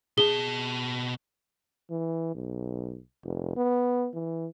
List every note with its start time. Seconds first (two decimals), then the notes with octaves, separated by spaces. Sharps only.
0.18 B2 G#4 A5 G7
1.91 E3
2.35 B1
3.24 F1
3.57 B3
4.14 E3